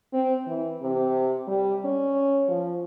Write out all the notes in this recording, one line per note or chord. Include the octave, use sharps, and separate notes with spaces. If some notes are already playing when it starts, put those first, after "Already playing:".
C4
E3
C3
G3
C#4
F3